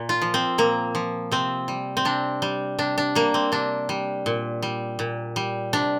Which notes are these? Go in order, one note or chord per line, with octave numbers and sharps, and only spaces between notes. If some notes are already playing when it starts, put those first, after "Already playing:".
Already playing: A#2
F4
F3
C4
A#2 A#3
F3
C3 C4
G3
C4
C3 D4
G3
C3 D4
D4
G3 A#3
C4
C3 D4
G3
A#2
G3
A#2
G3
C3 D4